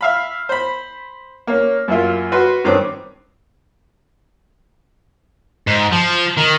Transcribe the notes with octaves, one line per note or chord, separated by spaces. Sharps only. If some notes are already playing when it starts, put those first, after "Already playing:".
E5 F5 B5
C5 B5
A#3 C#4
F#2 A#3 E4 F4
F#4 B4 C6
G2 D#3 C4 C#4 D6
G#2
F3
D#3